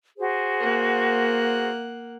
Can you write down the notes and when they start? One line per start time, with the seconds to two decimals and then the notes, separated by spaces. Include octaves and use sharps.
0.18 F#4 G#4 C5
0.60 A#3 F#5